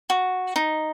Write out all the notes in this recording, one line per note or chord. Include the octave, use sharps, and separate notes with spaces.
F#4
D#4